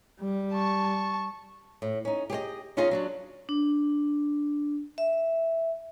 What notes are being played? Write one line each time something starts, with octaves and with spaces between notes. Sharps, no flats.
G3
A5 C#6
A2
C#4 D#4
G4 G#4 C#5 D#5
D#2 C#4 D#4 F4 G#4 D#5
F#3 D4 F#4
D4
E5